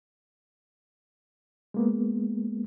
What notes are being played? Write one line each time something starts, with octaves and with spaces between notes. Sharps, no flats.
G#3 A#3 B3